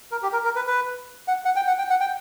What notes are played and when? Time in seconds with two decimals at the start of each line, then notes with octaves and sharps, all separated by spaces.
0.12 A#4
0.23 G4
0.33 A#4
0.44 A#4
0.56 B4
0.67 B4
1.28 F#5
1.45 F#5
1.56 G5
1.68 F#5
1.78 G5
1.90 F#5
2.00 G5